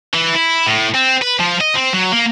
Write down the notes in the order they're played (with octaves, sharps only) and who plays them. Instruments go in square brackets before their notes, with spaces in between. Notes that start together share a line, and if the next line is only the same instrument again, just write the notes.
[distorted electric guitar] E3
E4
A2
C4
B4
F3
D#5
C4
F#3
A#3